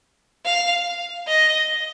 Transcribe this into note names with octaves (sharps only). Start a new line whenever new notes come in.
F5
D#5